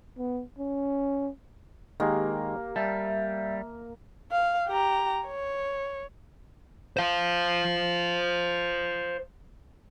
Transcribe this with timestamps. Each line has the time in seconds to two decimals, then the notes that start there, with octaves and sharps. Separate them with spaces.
0.18 B3
0.58 C#4
2.00 D#3 G#3 A#3 G4
2.76 G3 E5 A5
4.32 F5
4.68 G4 A#5
5.27 C#5
6.97 C5 F5